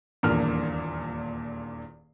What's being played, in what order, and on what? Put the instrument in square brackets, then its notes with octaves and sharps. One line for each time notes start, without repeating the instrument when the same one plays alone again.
[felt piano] D#1 E2 G2 A#2 A#4 F6